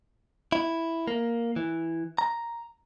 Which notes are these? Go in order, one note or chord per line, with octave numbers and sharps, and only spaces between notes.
E4
A#3
E3
A#5